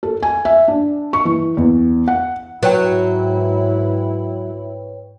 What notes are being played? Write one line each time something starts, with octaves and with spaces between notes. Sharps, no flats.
A4
G#5
E5
D4
C#6
E3
E2
F#5
G#2 F#3 E4 B4 C#5 G5